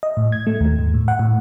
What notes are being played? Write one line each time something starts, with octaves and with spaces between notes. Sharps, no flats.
D#5
A2
G#6
A3
D#2
G#2
A2
F#5
A2